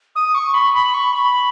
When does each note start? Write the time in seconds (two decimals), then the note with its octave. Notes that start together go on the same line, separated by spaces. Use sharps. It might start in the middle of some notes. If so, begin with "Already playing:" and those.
0.15 D#6
0.34 C#6
0.53 B5
0.74 B5
0.94 C#6
1.12 B5